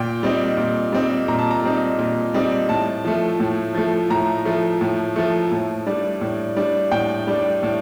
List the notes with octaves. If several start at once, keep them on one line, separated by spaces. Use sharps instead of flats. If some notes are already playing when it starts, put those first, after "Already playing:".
Already playing: A#2 G5
G3 C4 D#4
A#2
G3 C4 D#4
A#2 A#5
A5
A#5
G3 C4 D#4
A#2
G3 C4 D#4
A2 A5
F3 A3
A2
F3 A3
A2 A#5
F3 A3
A2
F3 A3
A2
G3 D4
A2
G3 D4
A2 G5
G3 D4
A2